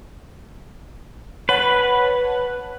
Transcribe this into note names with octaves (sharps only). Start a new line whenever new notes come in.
B4 C#5 F#5 A5